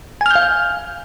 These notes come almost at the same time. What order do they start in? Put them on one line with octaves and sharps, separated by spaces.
G#5 F6 G6 F5